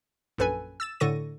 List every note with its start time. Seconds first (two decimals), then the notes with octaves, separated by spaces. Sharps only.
0.38 A#1 F#2 A4 B4 G#5
0.80 E6 A6 E7
1.00 A2 D3 A4 C#6 A#6 D#7